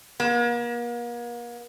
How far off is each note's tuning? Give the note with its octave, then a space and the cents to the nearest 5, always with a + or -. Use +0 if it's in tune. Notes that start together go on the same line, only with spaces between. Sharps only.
A#3 +40